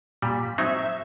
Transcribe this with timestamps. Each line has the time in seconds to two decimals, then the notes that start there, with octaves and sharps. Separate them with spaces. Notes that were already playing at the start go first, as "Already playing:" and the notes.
0.22 A#2 G3 B6
0.58 F#3 C4 D#4 E5